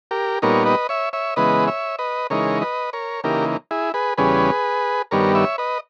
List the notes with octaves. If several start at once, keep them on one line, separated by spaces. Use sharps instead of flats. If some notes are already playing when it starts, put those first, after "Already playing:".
G4 A#4
A#2 G3 B3 D#4 A#4 C#5
B4 D#5
C#5 E5
C#5 E5
C#3 E3 G#3 B3 B4 D#5
C#5 E5
B4 D#5
C#3 E3 G#3 D#4 A#4 C#5
B4 D#5
A#4 C#5
C#3 E3 A#3 D#4 G4 A#4
E4 G#4
G#4 B4
E2 C#3 G3 C#4 G#4 B4
G2 D#3 G3 B3 A#4 C#5
C#5 E5
B4 D#5